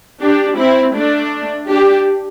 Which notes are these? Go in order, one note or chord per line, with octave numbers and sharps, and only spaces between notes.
D4 G4
C4 E4
A3 D4
D4 G4